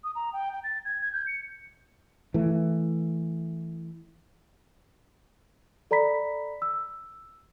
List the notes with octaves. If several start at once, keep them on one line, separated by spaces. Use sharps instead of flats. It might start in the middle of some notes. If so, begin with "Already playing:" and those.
D#6
A#5
G5
G5
A6
G#6
G#6
G6
C#7
E3 A3
A4 D5 A#5 B5 B6
E6